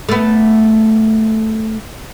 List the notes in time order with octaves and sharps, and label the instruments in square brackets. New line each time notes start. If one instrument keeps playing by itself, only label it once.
[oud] A3 B3